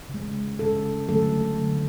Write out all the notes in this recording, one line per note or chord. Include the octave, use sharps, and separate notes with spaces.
C#3
G#3
C#3 G#3 A4
D3 F#3 A3 A4
D3 F#3 A3